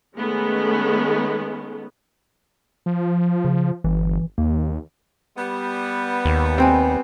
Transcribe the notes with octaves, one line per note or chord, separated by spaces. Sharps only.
D#3 G#3 A3 B3 C#4
F3
C#3
G1 E3
D#2 A#3
G3 B3
D#2
C4 B4 G5 G#5